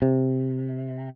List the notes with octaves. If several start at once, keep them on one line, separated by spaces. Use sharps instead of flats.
C3